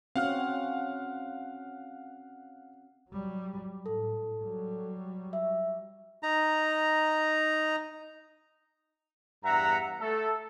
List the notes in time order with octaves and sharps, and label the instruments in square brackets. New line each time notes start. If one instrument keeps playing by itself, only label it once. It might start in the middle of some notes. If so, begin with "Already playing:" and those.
[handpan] C4 C#4 F#4 [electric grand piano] F5 F#5 F6
[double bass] F#3 G3
[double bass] A2 [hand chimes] A4
[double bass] F#3 G3
[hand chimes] E5
[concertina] D#4 A#5
[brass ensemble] E2 G2 E5 F#5 A#5
A3 A4